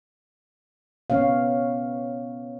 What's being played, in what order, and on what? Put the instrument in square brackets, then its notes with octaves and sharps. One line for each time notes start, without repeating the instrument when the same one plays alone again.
[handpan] B3 C#4 C#5 F5